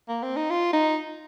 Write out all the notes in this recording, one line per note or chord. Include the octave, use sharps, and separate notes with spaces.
A#3
C4
D#4
F4
D#4